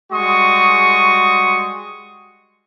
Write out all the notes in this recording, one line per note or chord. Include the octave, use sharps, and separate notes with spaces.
G3 G#3 F#4 C6 C#6 D#6